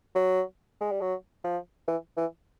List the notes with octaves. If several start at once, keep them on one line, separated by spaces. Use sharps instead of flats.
F#3
G#3
G3
F#3
F3
E3
E3